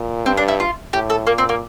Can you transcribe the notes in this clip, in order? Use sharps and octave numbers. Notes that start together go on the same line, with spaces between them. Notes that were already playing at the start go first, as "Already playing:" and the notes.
Already playing: A#2
G2 C4
D4
E4
F4
A2 G4
A4
A#2 A#3
C4
A#3